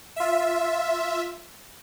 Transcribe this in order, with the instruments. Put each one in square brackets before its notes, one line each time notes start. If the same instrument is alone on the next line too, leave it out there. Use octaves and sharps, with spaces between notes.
[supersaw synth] F4 E5